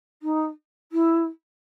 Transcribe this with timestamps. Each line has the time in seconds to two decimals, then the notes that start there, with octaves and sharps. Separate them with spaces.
0.22 D#4
0.92 E4